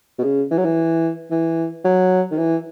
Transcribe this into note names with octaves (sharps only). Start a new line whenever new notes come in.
B2
C#3
E3
F#3
E3
E3
F#3
D#3
E3